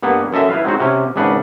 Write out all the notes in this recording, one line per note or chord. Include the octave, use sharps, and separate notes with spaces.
G2 A#3 B3 F#5
F#2 A4 D#5 E5
E4 B4 F5
F#3 G#3 C4 D#4 F#4
C3 C#4 G#5
G#1 C#3 D4 B4 F#5